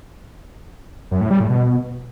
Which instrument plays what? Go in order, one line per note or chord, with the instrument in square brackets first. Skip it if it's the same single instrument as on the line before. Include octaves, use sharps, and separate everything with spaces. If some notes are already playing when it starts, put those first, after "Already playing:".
[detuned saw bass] F#2
A2
G3
A2
B2